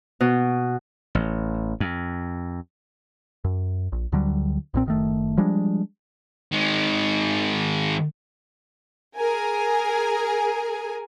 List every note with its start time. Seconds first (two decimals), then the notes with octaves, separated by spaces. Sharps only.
0.21 B2
1.15 A1
1.80 F2
3.45 F#2
3.92 A#1
4.12 D2 D3 F#3 G3
4.74 B1 A#2 C4
4.86 F#1 D#3 A3
5.38 F3 G3 G#3 D4
6.52 D#3 G#3
9.17 G#4 A#4 G#5